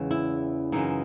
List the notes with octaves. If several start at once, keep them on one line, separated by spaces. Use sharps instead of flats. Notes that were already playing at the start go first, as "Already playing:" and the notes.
Already playing: E2 C#3 E3 G#3
E4
F#2 C#3 E3 D#4